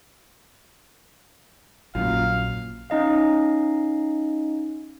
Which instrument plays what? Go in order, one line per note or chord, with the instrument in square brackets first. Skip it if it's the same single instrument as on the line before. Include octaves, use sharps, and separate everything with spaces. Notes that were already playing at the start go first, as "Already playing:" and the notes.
[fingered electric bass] A#1 [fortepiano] F#2 A#2 [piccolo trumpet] F5
[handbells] C#4 D#4 D#5 F5